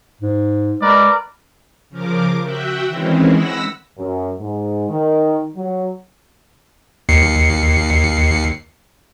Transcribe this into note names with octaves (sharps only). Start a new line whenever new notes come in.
G#2
G#3 A#4 B4 D5
C#3 F3 A#4 D6
F#4 E5 F#5 G5
D#3 E3 G#3 C4 C#4 E4
F#5 B5 E6 A#6 B6
F#2
G#2
D#3
F#3
D#2 C7 C#7